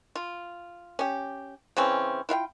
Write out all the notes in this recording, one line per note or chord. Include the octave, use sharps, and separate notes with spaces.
F4
C#4 G4
C#3 E3 C4 C#4
E4 F4 F5 G5